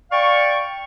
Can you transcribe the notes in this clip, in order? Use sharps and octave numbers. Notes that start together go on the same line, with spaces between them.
D5 F5 G5 C#6